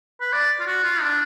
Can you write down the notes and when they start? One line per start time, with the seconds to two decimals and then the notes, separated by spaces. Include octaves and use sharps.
0.21 B4
0.32 D5
0.60 F4
0.67 F#4
0.84 F4
1.02 D4